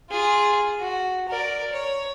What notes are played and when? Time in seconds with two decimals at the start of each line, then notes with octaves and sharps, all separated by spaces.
0.10 F4 G#4
0.80 F#4
1.28 A#4 D5
1.72 C#5